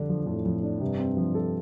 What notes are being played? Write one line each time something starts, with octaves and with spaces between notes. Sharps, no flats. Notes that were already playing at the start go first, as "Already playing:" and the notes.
Already playing: F2 D3 G3 D4
F3
F2 A2
F2
D4
G2 C3
C4
F3
A4